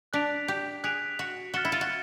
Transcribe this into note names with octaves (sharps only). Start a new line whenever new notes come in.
D4 F#6 B6 D7 F7
G4
G#4 F#6 B6 D7 F7
F#4
F#4 F6 A6 C#7 E7 G7
E4
F4
F#4